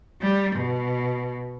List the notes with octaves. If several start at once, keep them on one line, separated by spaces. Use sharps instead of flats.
G3
B2